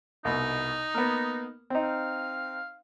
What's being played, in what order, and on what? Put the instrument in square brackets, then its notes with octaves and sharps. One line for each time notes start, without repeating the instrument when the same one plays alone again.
[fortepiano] C2 B2 [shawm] D#4
[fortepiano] A#3 B3
C4 D#4
[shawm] F5